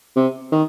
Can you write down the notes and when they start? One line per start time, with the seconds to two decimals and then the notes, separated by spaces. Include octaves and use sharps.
0.16 C3
0.52 D#3